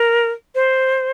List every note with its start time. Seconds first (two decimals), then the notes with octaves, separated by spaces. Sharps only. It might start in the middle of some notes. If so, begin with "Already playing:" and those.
Already playing: A#4
0.55 C5